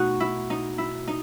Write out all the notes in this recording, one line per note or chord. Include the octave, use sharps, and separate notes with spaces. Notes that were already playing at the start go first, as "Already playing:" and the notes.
Already playing: B2 A3 D#4 F#4
E4
D#4
E4
D#4